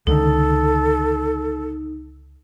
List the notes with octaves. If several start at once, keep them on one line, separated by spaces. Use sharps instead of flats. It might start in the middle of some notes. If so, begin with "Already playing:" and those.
C#2 D3 D#3 D#4 A4